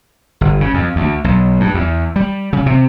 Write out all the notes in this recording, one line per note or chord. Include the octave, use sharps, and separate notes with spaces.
G1
C#3
F2
D2
B1
G2
E2
G3
C#3
C3